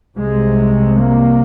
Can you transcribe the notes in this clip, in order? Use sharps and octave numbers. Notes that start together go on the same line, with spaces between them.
C2 C3 G#3
A#3